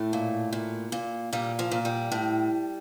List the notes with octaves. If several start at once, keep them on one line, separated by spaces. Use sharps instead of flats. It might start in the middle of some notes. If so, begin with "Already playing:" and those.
Already playing: A2 A3
A#2
A#2
A#2
A#2 G3
F3
A#2
G3
A2